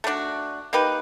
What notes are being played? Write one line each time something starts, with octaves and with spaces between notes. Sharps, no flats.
A3 D4 F#4
A#3 D#4 G4 B4